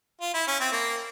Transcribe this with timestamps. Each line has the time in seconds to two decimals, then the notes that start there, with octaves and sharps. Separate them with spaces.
0.21 F4
0.34 E4
0.47 C#4
0.60 C4
0.72 A#3